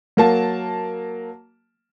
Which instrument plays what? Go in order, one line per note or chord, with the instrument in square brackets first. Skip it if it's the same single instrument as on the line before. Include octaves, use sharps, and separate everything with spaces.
[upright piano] F#3 A#3 A5